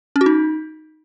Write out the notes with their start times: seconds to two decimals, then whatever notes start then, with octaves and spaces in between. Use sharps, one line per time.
0.16 C#4
0.21 F#4
0.26 D#4